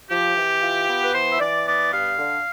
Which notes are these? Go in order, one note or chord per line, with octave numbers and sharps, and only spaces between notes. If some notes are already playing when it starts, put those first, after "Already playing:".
F3 G4
E3
F4
B3
B4
E3 C5
E5
E3 D5
B3 D5
G2 F5
D3